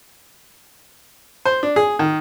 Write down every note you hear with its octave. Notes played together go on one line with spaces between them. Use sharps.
C5
D4
G#4
D#3